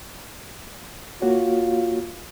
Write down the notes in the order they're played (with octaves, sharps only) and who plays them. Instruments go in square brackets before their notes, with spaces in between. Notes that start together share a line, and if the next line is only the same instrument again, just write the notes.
[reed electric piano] A#3 F#4 C#5 [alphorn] F4